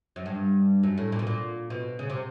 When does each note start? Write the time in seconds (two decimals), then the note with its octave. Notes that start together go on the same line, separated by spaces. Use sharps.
0.16 F#2
0.26 G2
0.83 F#2
0.98 A2
1.12 A#2
1.19 B2
1.27 A#2
1.70 B2
1.99 C#3
2.10 C3